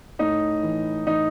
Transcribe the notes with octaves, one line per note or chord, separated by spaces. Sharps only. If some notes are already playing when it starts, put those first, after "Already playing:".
A2 D#4
E3
E3 D#4